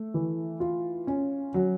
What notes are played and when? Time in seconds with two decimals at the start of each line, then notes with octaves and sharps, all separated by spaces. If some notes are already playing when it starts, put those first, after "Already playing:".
Already playing: A3
0.14 E3
0.60 F4
1.07 C#4
1.54 F#3